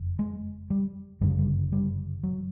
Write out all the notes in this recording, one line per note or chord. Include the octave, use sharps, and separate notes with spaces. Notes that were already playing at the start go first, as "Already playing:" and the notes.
Already playing: F#1 F2
G#3
G3
G1 F#2 C#3 G3
F#3
G3
G3
F#3